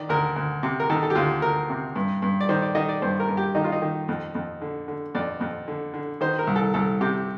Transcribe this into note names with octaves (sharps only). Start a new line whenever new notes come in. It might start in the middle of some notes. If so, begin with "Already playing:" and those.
Already playing: D#3 D5
D2 A#4
D2
C3
A#4
D#3 A4
A4
G4
D2 F4
D2 A#4
C3
G2
G2
D5
D#3 C5
D5
D#3 D#5
D5
G2 C5
A#4
G2
G4
D#3 D#4
F4
D#4
D#3
F2
F2
D3
D3
F2 D5
F2
D3
D3
D#3 C5
A#4
C2
A4
C2 A4
C3 G4